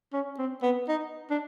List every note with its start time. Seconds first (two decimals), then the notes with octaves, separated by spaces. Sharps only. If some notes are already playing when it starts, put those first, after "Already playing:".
0.13 C#4
0.38 C4
0.62 B3
0.88 D#4
1.30 D4